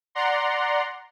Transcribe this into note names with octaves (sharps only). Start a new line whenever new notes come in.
D5 F#5 A#5 C6